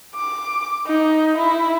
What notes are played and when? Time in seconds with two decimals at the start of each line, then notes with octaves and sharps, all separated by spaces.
0.16 D6
0.87 D#4
1.38 E4